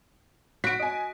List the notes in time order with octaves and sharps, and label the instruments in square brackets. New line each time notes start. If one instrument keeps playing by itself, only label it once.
[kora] F#4 [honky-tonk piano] B6 D7
[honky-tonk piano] D#5 G#5